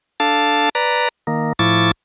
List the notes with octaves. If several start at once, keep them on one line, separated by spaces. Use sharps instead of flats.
D4 A4 F5 A5
B4 D5 A#5
D#3 A#3
A2 F3 E4 C#6 D6 A6